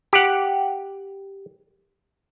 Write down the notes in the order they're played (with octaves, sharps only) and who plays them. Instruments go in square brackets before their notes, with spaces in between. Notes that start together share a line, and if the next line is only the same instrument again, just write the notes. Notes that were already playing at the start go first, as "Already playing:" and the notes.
[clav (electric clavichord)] G4 F#5